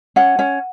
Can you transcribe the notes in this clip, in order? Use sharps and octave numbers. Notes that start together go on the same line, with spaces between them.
C#4 F#5
C#4